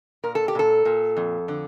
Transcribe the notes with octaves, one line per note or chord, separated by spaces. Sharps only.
A#2 A#4
A4
G4
A#2 A4
A#2
F2
D3